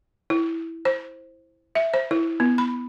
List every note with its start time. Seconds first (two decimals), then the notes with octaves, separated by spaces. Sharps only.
0.30 E4
0.85 C5
1.75 E5
1.94 C5
2.11 E4
2.40 B3
2.58 B5